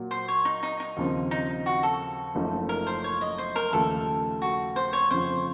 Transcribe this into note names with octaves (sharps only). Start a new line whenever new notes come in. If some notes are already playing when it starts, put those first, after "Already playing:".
Already playing: A#2 F#3 A#3
C5
C#5
D#4
D#4
D#4
D#2 C#3 F3 C4
D#4
F#4
A4
F#1 F#2 F3 A3 D#4
A#4
C5
C#5
D#5
C5
A#4
D#2 C#3 F3 A3 A4
F#4
C5
C#5
F2 C#3 F3 C5